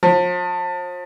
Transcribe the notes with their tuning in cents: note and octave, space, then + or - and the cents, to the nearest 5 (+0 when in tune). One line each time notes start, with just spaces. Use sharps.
F3 +40